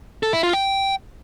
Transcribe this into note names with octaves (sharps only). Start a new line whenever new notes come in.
A4
E4
F4
G5